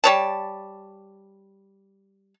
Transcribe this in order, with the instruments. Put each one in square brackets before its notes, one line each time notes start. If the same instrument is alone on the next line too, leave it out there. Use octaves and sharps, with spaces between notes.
[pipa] G3 C#5 A5